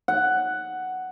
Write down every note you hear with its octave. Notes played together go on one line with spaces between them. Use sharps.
F#5